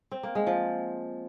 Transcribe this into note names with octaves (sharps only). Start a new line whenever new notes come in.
C4
A#3
G#3
F3